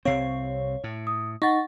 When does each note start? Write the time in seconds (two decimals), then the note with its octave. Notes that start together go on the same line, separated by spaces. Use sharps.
0.05 C2 C3 C4 C#5 F5 C7
0.84 A2
1.07 D#6
1.42 D#4 F#5 C#6 A6